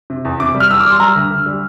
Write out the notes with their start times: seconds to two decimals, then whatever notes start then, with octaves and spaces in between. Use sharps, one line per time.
0.10 C3
0.25 E2
0.40 C3 D6
0.55 G3
0.60 F6
0.71 E2 E6
0.80 G3 D6
0.91 C6
1.00 G3 A#5
1.15 D2
1.30 D2
1.46 G3